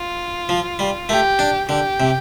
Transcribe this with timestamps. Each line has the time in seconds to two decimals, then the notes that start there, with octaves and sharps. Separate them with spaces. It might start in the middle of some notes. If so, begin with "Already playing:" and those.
Already playing: F4
0.49 F3
0.79 G3
1.09 A3 G4
1.39 D4
1.69 D3 G4
2.00 C3